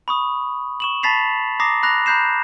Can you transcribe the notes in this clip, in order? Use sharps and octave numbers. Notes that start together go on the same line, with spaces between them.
B5 C#6 D#6
C#6 E7 F#7
A5 B5 A6 B6 C7 F7
A#5 D6 D#6 A#6 C7
B5 F#6 A#6 F7
A#5 B5 F#6 G6 C7 E7